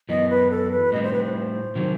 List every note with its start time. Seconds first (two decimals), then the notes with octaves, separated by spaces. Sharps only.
0.09 F#2 E3 B3 D#5
0.30 B4
0.51 A4
0.72 B4
0.92 A2 G3 C4 D#5
1.03 C5
1.13 B4
1.23 C5
1.76 C3 D#3 F#3